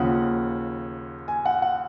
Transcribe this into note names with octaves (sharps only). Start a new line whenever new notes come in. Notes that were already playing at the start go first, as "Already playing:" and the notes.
Already playing: D#2 C#3 F3 F#5
G#5
F#5
F#5